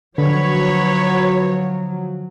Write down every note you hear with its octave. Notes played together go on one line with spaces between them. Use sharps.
D3 F3 F#3 B4 C#5